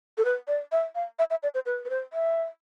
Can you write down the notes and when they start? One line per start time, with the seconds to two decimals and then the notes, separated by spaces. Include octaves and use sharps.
0.18 A4
0.25 B4
0.48 D5
0.72 E5
0.95 F5
1.19 E5
1.30 E5
1.43 D5
1.54 C5
1.66 B4
1.85 B4
1.90 C5
2.13 E5